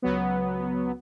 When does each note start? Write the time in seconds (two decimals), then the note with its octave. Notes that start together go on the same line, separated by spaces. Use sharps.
0.02 C#2 F#3 B3